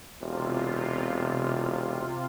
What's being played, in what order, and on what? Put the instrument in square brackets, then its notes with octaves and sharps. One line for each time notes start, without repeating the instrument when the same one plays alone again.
[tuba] E1 [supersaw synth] C3 F4